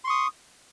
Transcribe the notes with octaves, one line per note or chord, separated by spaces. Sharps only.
C6 C#6 D#6